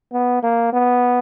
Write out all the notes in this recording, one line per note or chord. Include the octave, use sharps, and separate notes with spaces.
B3
A#3
B3